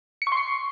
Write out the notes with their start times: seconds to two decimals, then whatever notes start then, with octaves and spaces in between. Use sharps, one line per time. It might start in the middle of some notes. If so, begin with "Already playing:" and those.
0.22 C#7
0.27 C#6
0.32 C6
0.37 C7